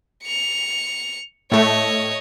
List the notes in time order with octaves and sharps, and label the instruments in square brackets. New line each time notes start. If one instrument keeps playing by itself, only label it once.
[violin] C#7 F7
[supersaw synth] A2 A3 [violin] C#5 D#5